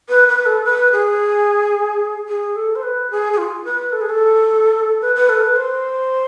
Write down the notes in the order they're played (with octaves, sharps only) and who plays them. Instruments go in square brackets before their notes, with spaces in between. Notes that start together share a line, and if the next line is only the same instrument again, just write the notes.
[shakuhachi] B4
B4
A4
B4
G#4
G#4
A4
C5
B4
G#4
G#4
F4
B4
A4
G#4
A4
B4
B4
A4
B4
C5